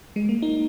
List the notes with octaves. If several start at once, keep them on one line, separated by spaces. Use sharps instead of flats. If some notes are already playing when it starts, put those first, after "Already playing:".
G#3
A#3
D#4